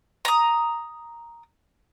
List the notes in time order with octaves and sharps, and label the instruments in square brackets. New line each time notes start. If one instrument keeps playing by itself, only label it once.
[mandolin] A#5 D#6